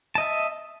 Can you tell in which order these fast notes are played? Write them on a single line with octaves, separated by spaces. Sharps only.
A5 D#5 E5